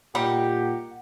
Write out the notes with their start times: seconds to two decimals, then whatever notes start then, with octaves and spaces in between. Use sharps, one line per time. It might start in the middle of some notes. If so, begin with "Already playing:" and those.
0.15 A#2 G3 A#3 D#4 G4 F#5